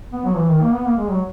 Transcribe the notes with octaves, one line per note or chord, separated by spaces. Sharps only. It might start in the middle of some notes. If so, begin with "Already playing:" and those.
B3
F#3
E3
D#3
A#3
B3
A#3
G#3
F#3